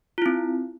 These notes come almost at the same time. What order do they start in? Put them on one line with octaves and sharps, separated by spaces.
F4 E4 C4